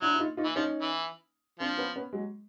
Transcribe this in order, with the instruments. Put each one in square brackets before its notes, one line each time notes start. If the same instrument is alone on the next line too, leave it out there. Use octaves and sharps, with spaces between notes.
[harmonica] F#3 [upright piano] D4 E4
[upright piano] E4
D#4 F4
D#4 F4
[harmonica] E3
[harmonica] F3 [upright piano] C#4 D#4
[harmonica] E3
[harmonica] F3 [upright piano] C4 D4
[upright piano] B3 C#4
B3 C#4
F#3 G#3